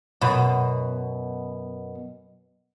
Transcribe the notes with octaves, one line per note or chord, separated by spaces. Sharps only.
F#2 B2